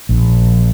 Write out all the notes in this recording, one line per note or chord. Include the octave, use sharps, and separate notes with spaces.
A#1